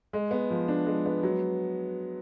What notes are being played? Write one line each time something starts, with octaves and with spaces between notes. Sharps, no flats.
G#3
B3
F3
D4
G#3
B3
F#3